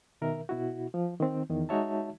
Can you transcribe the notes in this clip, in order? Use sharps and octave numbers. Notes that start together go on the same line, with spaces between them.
B2 D#3 A#4 E5
B2 E4 F#4
F3
D#3 C4
E2 D#3
G#3 D#4 F#4 C#5 E5 A5